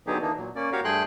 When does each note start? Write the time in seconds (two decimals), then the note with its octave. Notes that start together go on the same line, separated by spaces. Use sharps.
0.07 D3 F#3 B3 D#4 G4 G#4
0.22 E3 A#3 D4 D#4
0.37 A#2 F#3
0.55 A#3 C#4 D5
0.72 F#4 G4 A#4 C#5 F5
0.84 G2 A3 G#4 G5 C6 F#6